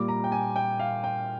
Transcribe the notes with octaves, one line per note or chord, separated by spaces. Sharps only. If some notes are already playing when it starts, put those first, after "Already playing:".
Already playing: A#2 G3 D6
A#5
G5
G#5
G5
F5
G5